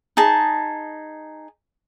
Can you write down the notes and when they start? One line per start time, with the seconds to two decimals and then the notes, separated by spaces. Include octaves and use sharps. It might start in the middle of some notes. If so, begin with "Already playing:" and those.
0.17 D#4 G#4 A5